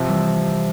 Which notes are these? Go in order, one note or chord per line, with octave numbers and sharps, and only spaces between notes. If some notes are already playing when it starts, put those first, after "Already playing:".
Already playing: C3 F3 C4
E3 G3